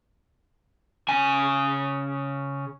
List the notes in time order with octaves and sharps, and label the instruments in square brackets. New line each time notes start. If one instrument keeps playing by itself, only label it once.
[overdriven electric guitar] C#3 G#5